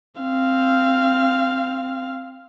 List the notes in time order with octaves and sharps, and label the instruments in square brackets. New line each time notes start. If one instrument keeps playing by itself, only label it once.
[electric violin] C4 F5